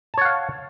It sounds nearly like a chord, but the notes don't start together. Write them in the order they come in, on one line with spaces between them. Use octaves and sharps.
A5 C#5 F#5 F5